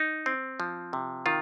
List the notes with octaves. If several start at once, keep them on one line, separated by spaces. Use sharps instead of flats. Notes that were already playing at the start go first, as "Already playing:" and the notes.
Already playing: D#4
C4
F3
C3
D#3 F4